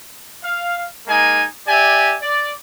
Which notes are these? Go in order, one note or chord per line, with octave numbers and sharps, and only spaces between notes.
F5
G#3 A#3 D#4 G#5
G4 D5 E5 G#5
D5